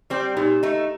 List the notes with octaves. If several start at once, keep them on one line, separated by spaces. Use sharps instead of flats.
G3 C4
A#2 D#4 G4
A3 D#4